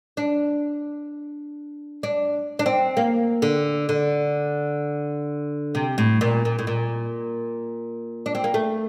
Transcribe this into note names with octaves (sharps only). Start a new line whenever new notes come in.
D4
D4
D4
C4
A#3
D3
D3
C3
A2
A#2
A#2
A2
A#2
D4
C4
A#3
A3